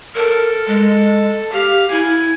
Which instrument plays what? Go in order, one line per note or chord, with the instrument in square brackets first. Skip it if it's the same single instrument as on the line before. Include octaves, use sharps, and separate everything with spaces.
[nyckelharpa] A4 [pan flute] A#4
[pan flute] G#3
[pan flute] G4 [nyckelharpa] F5
[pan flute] E4 [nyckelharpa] G#5